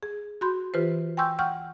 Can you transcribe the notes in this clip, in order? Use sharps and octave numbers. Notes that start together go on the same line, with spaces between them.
G#4
F#4 B5 C6 G6
E3 F4 G4 B4 C5
G5 G#5 C6 C#6 E6 G6
F#5 G5 C#6 F6 G6